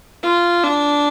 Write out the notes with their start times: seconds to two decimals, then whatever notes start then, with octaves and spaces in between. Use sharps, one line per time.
0.23 F4
0.63 D4